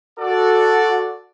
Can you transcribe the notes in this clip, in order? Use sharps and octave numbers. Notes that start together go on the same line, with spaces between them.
F#4 A4 D5